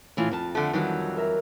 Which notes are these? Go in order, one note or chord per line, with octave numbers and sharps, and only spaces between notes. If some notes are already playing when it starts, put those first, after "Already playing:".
A2 E3 F4
F2 A5
D3 A3
D#3 E3 F#3 G3
A#4 E5 A#5